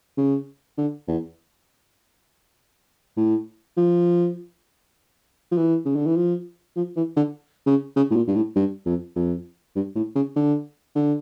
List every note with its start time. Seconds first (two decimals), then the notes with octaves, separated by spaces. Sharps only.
0.17 C#3
0.78 D3
1.08 E2
3.17 A2
3.77 F3
5.51 F3
5.57 E3
5.85 C#3
5.95 D3
6.06 E3
6.16 F3
6.76 F3
6.96 E3
7.16 D3
7.66 C#3
7.96 C#3
8.10 A2
8.16 A#2
8.27 G2
8.35 A2
8.56 G2
8.86 F2
9.16 F2
9.76 G2
9.96 A2
10.16 C#3
10.36 D3
10.95 D3